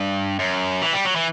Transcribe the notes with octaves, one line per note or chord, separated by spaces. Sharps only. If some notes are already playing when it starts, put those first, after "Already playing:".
Already playing: G2
F#2
E3
G3
F#3
E3